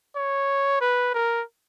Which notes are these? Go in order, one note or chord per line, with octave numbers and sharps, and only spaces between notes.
C#5
B4
A#4